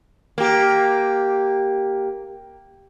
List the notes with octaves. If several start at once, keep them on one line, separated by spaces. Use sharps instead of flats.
A#3 G4